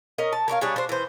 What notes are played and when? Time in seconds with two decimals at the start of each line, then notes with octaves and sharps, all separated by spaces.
0.18 C#4 A#4 D#5
0.33 A5
0.48 A#4 C#5 D5 F5
0.61 G3 D4 G#4 C#5
0.76 D4 C5
0.89 E3 C5